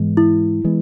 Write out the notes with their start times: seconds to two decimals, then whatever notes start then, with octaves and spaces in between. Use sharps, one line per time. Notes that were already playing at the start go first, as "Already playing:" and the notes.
Already playing: G#2 E3 G#3 B3
0.17 E4
0.64 E3 G#3 B3